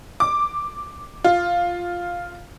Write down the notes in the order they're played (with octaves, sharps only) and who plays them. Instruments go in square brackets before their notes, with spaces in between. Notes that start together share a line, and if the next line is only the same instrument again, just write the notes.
[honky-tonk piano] D6
F4